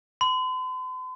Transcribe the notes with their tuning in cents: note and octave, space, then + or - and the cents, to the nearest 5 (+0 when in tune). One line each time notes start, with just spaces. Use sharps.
C6 -45